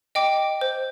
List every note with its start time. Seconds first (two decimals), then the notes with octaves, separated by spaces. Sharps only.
0.15 D#5 G5 D6
0.61 C5